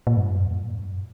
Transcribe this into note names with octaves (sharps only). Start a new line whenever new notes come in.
A#2
G2
F#2
E2
F#2
A#2
G2
F#2